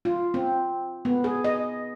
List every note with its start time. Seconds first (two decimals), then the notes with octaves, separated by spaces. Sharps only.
0.05 F4
0.34 C4
1.05 B3
1.24 G#4
1.44 D#5